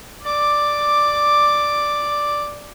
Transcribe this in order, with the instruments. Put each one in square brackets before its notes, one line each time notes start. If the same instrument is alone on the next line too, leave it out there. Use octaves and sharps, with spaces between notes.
[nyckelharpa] D5 D6